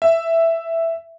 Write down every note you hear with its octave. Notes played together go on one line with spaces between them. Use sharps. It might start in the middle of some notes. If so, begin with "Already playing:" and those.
E5